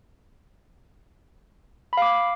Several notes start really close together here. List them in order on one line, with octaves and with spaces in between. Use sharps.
B5 F5 D6